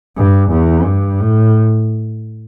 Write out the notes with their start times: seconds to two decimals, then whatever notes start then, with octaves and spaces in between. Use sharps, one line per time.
0.17 G2
0.50 E2
0.85 G2
1.20 A2